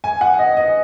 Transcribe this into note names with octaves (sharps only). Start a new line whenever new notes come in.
G#5
F#5
D#5
D#5